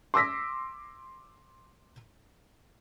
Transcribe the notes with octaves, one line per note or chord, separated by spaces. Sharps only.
C6 D6 E6 A#6 B6